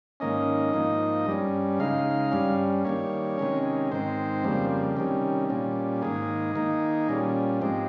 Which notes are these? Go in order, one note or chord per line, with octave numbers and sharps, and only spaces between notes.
G#2 D#3 A#3 C#4 D#5
G#2 F3 A#3 D#4
G2 G3 C#4
C#3 G#3 D#4 F5
G2 G3 C#4
D#3 G3 A#3 C#5
C3 D#3 G#3 C#4
G#2 D#3 G#3 C4 C5
F2 C#3 G3 A#3
C3 D#3 G3 C#4
A#2 G3 C#4
G#2 D#3 A#3 G#4
D#3 A#3 D#4
A#2 G3 C#4
G#2 F3 G#3 C4 G4